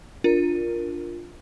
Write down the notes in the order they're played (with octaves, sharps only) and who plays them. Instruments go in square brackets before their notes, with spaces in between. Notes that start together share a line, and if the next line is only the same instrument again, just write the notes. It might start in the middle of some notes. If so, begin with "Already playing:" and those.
[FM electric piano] D4 A#4 [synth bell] F4